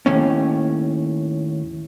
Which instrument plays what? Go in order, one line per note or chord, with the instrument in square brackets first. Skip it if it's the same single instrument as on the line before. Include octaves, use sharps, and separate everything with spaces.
[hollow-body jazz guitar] D#2 A2 C#4